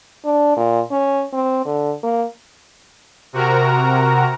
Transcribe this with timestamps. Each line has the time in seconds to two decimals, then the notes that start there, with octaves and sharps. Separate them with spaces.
0.25 D4
0.57 A#2
0.91 C#4
1.33 C4
1.65 D3
2.03 A#3
3.33 C3 F#4 A#4 A#5